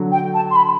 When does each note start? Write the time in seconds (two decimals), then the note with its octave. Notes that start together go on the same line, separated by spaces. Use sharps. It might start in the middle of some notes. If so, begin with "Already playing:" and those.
Already playing: D3 F#3
0.11 G5
0.34 A5
0.50 C6
0.55 B5